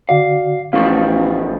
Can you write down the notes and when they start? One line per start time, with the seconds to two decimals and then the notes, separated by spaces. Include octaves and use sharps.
0.09 D3 F#4 D5 F5
0.73 A1 B2 F3 A3 F5 C#6